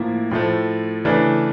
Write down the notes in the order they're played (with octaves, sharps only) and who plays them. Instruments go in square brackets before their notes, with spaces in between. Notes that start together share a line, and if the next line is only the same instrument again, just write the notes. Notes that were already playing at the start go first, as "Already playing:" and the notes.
Already playing: [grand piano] A2 F3 A#3 E4
A2 F3 A3
C#3 E3 A3 D4